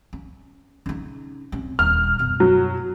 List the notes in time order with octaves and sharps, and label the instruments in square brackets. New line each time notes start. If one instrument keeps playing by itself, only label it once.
[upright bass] C#4
C#3 D#4
C3 C#4
[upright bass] D#1 [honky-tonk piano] F6
[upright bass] F#2 B2
[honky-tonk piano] F#3